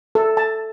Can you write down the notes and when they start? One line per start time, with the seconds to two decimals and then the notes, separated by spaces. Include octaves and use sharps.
0.15 A4
0.37 A5